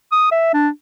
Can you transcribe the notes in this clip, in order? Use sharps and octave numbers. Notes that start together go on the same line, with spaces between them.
D#6
E5
D4